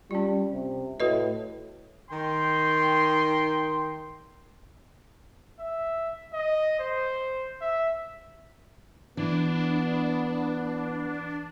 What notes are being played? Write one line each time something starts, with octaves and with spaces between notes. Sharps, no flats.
G3 C#4 F4
C3
A2 F#4 B4 D#5
D#3 G5 C6
E5
D#5
C5
E5
E3 B3 D4